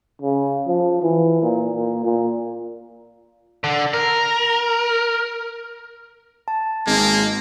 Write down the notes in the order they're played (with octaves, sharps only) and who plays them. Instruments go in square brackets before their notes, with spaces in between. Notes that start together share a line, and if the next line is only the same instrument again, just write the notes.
[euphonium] C#3
F3
E3
A#2
A#2
A#2
[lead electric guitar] D3
A#4
[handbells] A5
[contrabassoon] G#1 [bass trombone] G#3 [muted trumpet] A#3